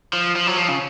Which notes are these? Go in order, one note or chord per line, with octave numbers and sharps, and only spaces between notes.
F3
F3
F#3
F3
C#3